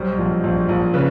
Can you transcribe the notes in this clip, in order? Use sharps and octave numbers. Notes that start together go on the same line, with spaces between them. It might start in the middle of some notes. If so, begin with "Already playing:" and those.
Already playing: B1 G3 C5
A#1
A#1
A#1
C#3 B4